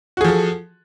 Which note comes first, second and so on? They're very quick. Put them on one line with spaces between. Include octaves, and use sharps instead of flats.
F#4 G#4 F3 A4